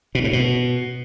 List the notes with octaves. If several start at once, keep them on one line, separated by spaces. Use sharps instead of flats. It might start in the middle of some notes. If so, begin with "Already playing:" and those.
B2
A2
B2